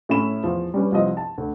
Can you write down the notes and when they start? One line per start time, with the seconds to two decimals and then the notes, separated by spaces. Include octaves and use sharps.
0.09 A2 C#4 E4 B5 E7
0.43 E2 F3
0.74 G3 C#4 B4
0.92 C2 F3 D#5
1.17 A5
1.38 D2